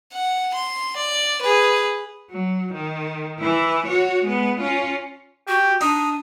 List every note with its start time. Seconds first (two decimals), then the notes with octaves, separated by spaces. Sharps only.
0.13 F#5
0.54 C6
0.96 D5
1.41 G#4 B4
2.30 F#3
2.73 D#3
3.39 E3 E4
3.86 F#4 C#5
4.25 G#3 B3
4.60 C#4 F4
5.48 F#4 G4
5.81 D4 D#4 D#6